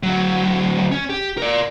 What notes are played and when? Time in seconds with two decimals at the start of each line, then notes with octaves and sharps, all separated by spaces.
0.03 D2 F#3
0.92 C#4
1.10 G4
1.38 A#4 D5